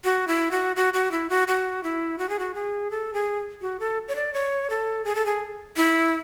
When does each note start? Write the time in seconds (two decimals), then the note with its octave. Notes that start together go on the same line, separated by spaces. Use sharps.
0.04 F#4
0.28 E4
0.51 F#4
0.76 F#4
0.94 F#4
1.11 E4
1.30 F#4
1.48 F#4
1.83 E4
2.19 F#4
2.29 G#4
2.39 F#4
2.55 G#4
2.91 A4
3.14 G#4
3.61 F#4
3.80 A4
4.08 C#5
4.16 D5
4.34 C#5
4.70 A4
5.05 G#4
5.15 A4
5.26 G#4
5.77 E4